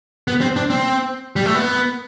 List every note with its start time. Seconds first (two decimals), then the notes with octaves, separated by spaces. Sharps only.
0.28 B3
0.41 C4
0.56 D4
0.70 C4
1.36 G3
1.46 A3
1.55 B3